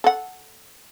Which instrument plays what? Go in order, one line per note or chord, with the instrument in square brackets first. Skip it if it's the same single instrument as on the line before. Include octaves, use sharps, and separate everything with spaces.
[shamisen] A4 F#5